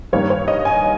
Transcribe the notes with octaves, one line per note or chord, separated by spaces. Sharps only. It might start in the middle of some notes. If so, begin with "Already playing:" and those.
G2 D#3 G3 A#3 C#5
C#5
D#5
G#5